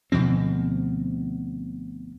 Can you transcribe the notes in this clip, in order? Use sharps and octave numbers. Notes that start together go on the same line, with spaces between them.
D2 B2 F3 C4